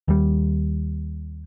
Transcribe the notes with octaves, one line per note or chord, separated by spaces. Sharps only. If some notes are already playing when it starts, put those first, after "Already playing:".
D#2 G3